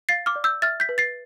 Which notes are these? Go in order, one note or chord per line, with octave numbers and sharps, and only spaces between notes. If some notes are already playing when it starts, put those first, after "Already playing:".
F5 A6 C7
D6 F6
D5
E6 G6
E5 F6 A6
G6 B6
B4
A6 C7